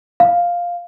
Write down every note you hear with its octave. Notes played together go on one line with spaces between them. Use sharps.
F5